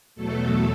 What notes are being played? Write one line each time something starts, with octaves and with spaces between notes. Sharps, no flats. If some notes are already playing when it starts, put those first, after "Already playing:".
E2 B2 F#3 A3 A4